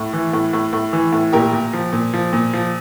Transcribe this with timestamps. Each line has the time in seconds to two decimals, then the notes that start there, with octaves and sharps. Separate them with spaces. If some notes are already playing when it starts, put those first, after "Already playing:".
Already playing: A2
0.13 E3
0.33 A2
0.53 A2
0.73 A2
0.93 E3
1.12 A2
1.33 A#2 G4 A#4
1.53 A#2
1.73 F3
1.93 A#2
2.13 F3
2.33 A#2
2.53 F3